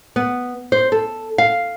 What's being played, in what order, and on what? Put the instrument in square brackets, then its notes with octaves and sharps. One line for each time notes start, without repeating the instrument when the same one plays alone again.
[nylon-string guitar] B3
C5
A4
F5